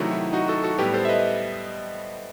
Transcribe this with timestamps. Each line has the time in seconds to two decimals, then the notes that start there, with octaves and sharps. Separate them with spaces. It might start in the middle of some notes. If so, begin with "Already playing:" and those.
Already playing: C3 D#3 F#3 A3 E4
0.11 E4
0.33 D#4 F#4
0.48 F#4 A4
0.63 F#4 A4
0.78 A2 G3 B3 G4 B4
0.94 A4 C5
1.05 E5
1.09 B4 D#5